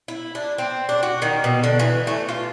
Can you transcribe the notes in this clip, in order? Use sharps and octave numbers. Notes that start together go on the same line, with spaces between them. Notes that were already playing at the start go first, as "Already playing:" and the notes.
E4
D4
C4
D4
F#4
D#3
B2
D3
E3
A3
F4